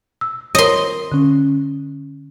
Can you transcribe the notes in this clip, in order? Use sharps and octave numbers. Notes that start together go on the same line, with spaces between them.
E6
A#4 C#5 D#5 C6
D3 C#4